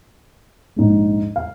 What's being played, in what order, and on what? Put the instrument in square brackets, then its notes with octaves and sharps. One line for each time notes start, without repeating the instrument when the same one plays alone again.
[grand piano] A#1 G#2 G#3
F5